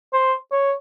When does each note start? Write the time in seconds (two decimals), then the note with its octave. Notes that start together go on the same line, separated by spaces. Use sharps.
0.13 C5
0.52 C#5